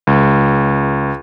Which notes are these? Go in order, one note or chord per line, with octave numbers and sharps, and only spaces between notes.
C#2